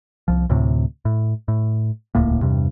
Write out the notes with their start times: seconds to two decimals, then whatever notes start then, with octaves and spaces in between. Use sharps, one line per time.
0.28 C2 F3
0.50 D2 A2 C3
1.05 A2
1.48 A2
2.15 D#1 C#2 A2 A#3
2.42 E2 G2 C3